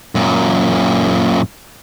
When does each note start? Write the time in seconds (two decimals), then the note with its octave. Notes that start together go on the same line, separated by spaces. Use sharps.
0.15 F#2 A#2